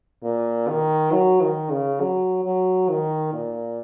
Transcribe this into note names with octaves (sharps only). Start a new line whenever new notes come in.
A#2
D#3
F#3
D#3
C#3
F#3
F#3
D#3
A#2